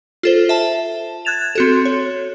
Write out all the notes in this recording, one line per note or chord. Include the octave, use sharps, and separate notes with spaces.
F4 A4 C5
E5 A5
F#6 G#6 A6 E7 F7
C4 F#4 A4
C#5